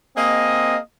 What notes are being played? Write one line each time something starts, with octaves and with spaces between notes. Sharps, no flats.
A#3 C4 G#4 D#5